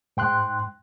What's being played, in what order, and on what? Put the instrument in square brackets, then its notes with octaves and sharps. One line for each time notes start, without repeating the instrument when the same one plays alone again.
[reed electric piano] G#2 G5 C6 F#6